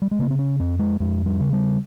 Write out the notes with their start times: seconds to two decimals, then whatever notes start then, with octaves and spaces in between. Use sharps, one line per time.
0.02 G3
0.11 G#3
0.19 C#3 A#3
0.30 C4
0.39 C#4
0.60 F2 C4
0.79 G#3
1.00 F2 G#3
1.26 G3
1.40 C#3
1.53 G3